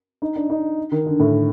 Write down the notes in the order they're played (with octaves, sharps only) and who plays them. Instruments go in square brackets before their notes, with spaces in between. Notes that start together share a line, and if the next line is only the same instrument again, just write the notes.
[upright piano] D#4
D4
D#4
D#3
D3
A2